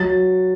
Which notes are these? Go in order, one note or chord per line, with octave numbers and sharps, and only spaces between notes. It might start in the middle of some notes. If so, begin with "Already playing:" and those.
Already playing: F#3 A6